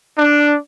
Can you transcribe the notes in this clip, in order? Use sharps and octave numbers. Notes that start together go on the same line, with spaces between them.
D4